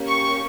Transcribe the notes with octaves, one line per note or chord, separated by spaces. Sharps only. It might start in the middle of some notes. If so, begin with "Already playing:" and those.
Already playing: A#3 C#4 G4
C#6